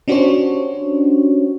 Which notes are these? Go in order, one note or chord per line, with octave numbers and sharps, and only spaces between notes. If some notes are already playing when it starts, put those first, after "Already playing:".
C#4 D4 F#4 G4 C5 C#5